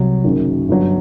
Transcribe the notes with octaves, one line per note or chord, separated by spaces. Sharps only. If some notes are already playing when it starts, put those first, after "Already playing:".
Already playing: C2 C3 F#3
F#1 F#2 D#3
G1 G2 F#3